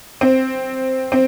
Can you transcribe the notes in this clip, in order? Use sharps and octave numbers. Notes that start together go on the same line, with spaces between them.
C4
C4